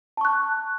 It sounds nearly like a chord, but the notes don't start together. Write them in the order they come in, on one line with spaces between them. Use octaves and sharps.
A5 C#6 F#6